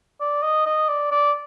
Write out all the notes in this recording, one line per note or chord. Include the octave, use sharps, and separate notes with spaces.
D5
D#5
D#5
D5
D5